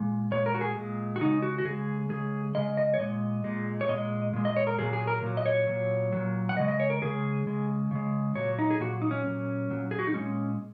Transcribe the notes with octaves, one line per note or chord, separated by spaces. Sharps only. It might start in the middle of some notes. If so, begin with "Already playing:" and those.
Already playing: A#2 G#3
A#2 G#3 C#5
A#4
F#4
G#4
A#2 G#3
F#4
C#3 G#3 D#4
F#4
F#4
C#3 G#3 G#4
C#3 G#3 G#4
C#3 G#3 D#5
D#5
C#5
A#2 G#3 D#5
A#2 G#3
C#5
A#2 G#3 D#5
A#2 G#3
D#5
C#5
A#4
A#2 F#3 G#4
G#4
A#4
A#2 F#3
D#5
C#5
A#2 F#3
A#2 F#3
F#5
C#3 G#3 D#5
D#5
C#5
A#4
C#3 G#3 G#4
C#3 G#3
C#3 G#3
A#2 F#3 C#5
D#4
G#4
A#2 F#3 F#4
D#4
C#4
A#2 F#3
A#2 F#3
G#4
F#4
D#4
A#2 G#3 C#4